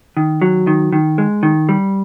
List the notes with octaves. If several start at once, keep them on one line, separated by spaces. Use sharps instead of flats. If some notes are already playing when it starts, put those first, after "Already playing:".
D#3
F#3
D#3
D#3
G#3
D#3
G3